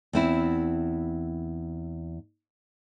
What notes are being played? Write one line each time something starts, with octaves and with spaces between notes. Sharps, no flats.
E2 C4 E4